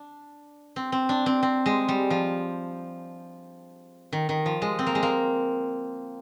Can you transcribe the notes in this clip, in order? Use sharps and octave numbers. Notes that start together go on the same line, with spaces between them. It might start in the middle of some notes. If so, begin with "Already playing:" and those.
Already playing: D4
C4
C4
D4
C4
C4
G#3
G3
F3
D#3
D#3
F3
G#3
C4
A#3
G#3
A#3